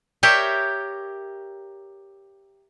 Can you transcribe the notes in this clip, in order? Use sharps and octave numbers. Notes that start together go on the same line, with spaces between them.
G4 A#4 C#5 E5 G5